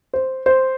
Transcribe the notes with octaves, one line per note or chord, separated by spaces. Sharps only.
C5
C5